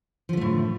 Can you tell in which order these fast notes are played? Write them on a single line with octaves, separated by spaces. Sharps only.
F3 D3 A3 A2